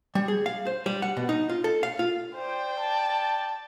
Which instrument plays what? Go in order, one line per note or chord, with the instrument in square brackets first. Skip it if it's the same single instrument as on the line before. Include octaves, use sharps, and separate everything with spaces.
[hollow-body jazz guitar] G3
G#4
F5
C5
G3
F#5
B2
D#4
F4
A4
F5
F4
[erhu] C5 [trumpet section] D5 G5
[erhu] A5